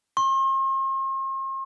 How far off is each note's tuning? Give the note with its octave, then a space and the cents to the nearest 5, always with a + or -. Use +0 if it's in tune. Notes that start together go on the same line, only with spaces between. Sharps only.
C6 +45